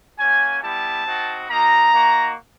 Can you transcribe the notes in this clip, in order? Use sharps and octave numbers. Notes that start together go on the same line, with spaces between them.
A#3 C#4 F#4 G#5
G3 B3 E4 G4 A5
C4 D#4 F#4
A#3 D#4 F#4 A#5
A#3 D#4 F#4